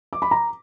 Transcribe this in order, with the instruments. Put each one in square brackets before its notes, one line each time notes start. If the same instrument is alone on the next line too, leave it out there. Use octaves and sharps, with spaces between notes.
[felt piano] D6
B5
A#5